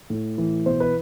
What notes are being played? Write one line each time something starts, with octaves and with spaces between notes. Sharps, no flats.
A2
E3
B2 C5
B4